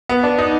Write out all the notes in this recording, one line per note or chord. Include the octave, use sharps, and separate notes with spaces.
B3
D4
D#4